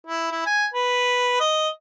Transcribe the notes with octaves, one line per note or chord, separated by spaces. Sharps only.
E4
E4
G#5
B4
D#5